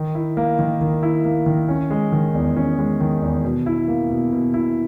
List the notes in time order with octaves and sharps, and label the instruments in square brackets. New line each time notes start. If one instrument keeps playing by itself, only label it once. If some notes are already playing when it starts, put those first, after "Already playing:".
Already playing: [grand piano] D#3
E4
A#3
D#3
D#3
E4
A#3
D#3
C#4
G#3
D#3
E2
C#4
G#3
D#3
E2
B2
E4
A#3
B2
B2
E4